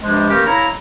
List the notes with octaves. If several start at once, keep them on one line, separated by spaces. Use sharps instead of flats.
G2 C3 F3 G#3
E3 A3 A#3 C#4 G4 A#4
E4 C#5 F5 A#5